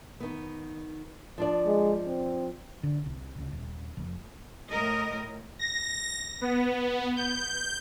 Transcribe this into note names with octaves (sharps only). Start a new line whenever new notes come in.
D#3 B3
F3 D4 D5
G#3
C4
D3
C2
C#2
D#1
F1
A2 A#4 D#5
A#6
B3
G6